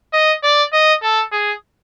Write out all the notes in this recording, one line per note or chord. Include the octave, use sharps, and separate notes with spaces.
D#5
D5
D#5
A4
G#4